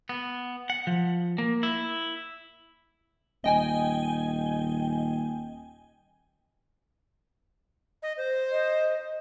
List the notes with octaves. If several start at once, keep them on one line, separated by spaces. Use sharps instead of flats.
B3
F#5
F3
A#3
E4
D#1 D#5 G5 G#5
D#5
C5
D#5